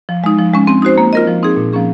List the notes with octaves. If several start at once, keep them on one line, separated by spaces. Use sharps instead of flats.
F3
G#3 D#4
F3
G#3 C#4
C4
D#4 F#4 C5
A#3
F4 A#4 D#5
F3
C4 D#4 G#4
A#2
F3 A#3 C#4 G#4